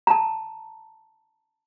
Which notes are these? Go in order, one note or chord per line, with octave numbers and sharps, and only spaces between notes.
A5 A#5